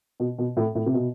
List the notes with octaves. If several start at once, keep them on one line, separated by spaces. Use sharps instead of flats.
B2
B2
A2
A2
C3
B2